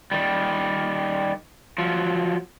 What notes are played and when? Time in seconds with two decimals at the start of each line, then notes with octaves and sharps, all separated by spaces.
0.12 D#3 G3
1.78 F3 F#3